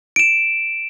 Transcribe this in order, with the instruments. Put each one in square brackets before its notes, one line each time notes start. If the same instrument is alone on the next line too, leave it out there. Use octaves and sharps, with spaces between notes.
[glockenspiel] D7 E7